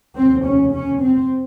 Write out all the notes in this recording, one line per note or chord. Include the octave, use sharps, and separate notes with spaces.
F1 D#2 C#3 C4
C#4
C#4
C4